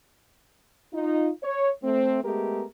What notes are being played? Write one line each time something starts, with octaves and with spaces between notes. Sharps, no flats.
D#4 F4
C#5
A3 C4
G#3 A3 B3 G4 G#4 A#4